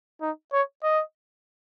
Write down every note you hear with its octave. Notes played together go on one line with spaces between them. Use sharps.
D#4
C#5
D#5